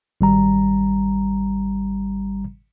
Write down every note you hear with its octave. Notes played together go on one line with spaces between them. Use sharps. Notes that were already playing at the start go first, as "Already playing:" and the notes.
G#1 G3 A#5